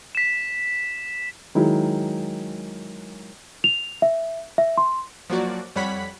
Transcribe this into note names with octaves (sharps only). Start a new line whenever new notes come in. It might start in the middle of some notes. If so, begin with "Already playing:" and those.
B6 E7
D#3 F#3 G#3 E4
F7
E5
E5
C6
F3 F#3 A#3 F#4 D5
F2 G3 C#5 F#5 B5 B6